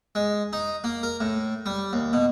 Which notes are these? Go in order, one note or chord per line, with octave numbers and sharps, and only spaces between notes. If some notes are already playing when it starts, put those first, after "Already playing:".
G#3
D#4
A#3
A#4
A2
G3
D#2
B2